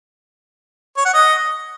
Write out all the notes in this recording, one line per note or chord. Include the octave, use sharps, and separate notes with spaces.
C#5
F#5
D#5